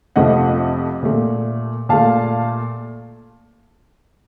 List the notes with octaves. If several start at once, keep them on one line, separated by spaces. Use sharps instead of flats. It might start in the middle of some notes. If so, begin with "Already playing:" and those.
F2 C3 F3 A3 D#5 F#5
A#2 A3
A#2 A3 F5 A5